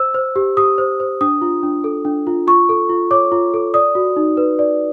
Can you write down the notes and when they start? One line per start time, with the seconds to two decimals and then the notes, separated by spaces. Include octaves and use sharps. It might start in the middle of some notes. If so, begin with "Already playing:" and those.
Already playing: C5 E6
0.14 C5
0.36 G4
0.57 G4 D#6
0.78 C5
1.00 C5
1.21 D4 D#6
1.42 F4
1.63 D4
1.84 A4
2.05 D4
2.27 F4
2.47 F4 C#6
2.69 A4
2.89 F4
3.11 C#5 D6
3.32 F4
3.54 A4
3.74 D5 D#6
3.95 F#4
4.16 D#4
4.37 B4
4.59 D5